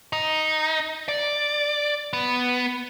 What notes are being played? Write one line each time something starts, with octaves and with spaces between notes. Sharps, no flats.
D#4
D5
B3